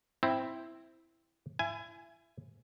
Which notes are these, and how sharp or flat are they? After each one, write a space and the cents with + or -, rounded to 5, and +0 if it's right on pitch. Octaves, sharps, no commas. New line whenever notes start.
C4 +0 E4 +0
E4 +30 G#5 +0